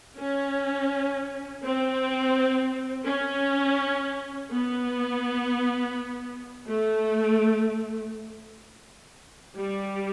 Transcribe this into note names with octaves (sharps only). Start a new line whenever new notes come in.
C#4
C4
C#4
B3
A3
G3